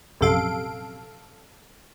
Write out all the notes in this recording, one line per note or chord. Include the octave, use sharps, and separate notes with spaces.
A#1 F#2 C3 A4 F5 D7